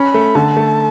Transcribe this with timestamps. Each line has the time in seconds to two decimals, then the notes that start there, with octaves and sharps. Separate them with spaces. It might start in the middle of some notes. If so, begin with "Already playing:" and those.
Already playing: C#4 B5
0.14 A3
0.35 D3 A5
0.57 A3